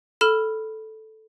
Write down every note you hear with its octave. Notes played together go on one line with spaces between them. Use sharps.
A4 B5 F6 E7